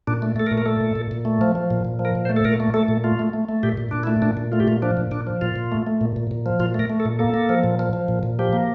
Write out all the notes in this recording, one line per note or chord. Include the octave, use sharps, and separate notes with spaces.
A#2 D4
A3
A3 A4
A#4
A#2
A#4
A3 A4
A#2
A#2
A#2
A3
F3
F3
A#2
A#2
F3
A#4
A#2
C5
A3
A4
A#2 A#4
A3
A3 A4
A#2
A3 F4
A3
A3
A3
A#2 G4
A#2
A#2 D4
E4
A3
A#2 D4
A#2
A3 F4
G4
A#2 F4
F3 D4
A#2
A#2 D4
F3
A#2 F4
A#2
A3
A3
A#2
A#2
A#2
F3
A#2 F4
A3 A#4
A3
A4
A#2
A#3 A4
A#3
F3
A#2
F3
F3
A#2
A#2
F3 G4
A#3